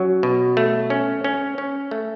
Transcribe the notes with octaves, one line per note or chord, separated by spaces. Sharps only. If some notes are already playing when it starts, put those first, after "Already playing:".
Already playing: F#3 C#4
B2
A3
C#4
C#4
C#4
A3